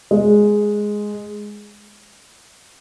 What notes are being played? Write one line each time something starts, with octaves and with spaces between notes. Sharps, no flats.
G#3